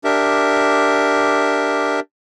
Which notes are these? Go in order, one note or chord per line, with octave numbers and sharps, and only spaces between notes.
D4 G4 A#4 E5